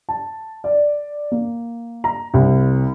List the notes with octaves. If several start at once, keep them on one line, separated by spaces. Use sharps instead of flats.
A5
D5
A#3
A#5
C2